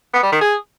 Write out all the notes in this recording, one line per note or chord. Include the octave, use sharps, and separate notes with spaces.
B3
G3
D#3
G#4